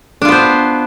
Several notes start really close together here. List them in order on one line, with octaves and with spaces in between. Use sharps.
D4 F4 B3 C5